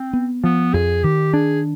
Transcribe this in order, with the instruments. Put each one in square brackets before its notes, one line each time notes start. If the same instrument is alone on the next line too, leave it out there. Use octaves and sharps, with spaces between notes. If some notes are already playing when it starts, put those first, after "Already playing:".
Already playing: [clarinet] C4
[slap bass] B3
[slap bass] F3 [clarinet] B3
[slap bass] F2 [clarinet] G#4
[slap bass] D#3 [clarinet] G4
[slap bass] D4 [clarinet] G#4